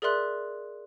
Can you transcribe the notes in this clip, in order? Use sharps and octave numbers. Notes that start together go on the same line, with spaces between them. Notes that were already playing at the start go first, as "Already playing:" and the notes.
G#4 A#4 D5 E5 C6 F#6